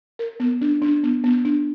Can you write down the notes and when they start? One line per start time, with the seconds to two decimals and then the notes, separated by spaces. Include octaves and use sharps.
0.19 A#4
0.40 B3
0.61 D4
0.82 D4
1.03 B3
1.24 B3
1.45 D4